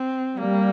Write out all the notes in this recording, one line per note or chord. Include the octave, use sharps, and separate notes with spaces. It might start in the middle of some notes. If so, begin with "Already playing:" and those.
Already playing: C4
G3 A#3